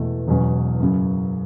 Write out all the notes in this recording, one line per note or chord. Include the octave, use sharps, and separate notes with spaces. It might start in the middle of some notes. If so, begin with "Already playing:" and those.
Already playing: E1 E2 B2 A3
E1 E2 B2 F#3 C#4
F#2 C#3 F#3